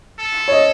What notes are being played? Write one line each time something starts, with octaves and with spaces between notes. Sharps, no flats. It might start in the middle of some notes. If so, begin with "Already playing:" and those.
A4
C#5
D#5